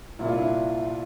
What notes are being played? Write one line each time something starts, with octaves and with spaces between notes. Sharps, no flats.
C2 A#2 E4
F4
D4 E4